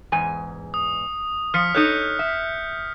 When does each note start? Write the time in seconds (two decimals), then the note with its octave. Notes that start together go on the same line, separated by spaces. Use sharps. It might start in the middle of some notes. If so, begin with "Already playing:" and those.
0.12 E2 G#2 G#5
0.74 D#6
1.54 F3 F6 B6 C#7
1.75 D#4 A4 C#5 F#6 G6 C#7
2.19 E5